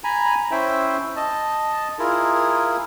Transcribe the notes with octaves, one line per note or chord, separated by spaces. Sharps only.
G#5 A#5 B5
C#4 E4 C5 E5 G5
D#5 A5
E4 F4 G#4 A#4